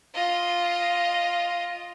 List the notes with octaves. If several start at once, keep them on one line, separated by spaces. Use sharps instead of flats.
F4 D#5